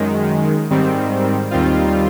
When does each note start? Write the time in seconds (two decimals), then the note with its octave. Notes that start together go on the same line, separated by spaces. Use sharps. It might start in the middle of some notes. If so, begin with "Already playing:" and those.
Already playing: F#2 D#3 G#3
0.71 G#2 D#3 G3 C4
1.51 D#2 D#3 G3 C4 F4